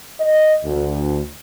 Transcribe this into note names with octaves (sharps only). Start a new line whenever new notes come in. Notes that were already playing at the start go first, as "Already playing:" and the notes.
D#5
D2